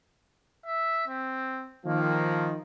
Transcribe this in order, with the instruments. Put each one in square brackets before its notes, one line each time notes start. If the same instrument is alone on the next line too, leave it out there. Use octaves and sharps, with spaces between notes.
[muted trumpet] E5
C4
[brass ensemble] D#3 F3 [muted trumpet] A#3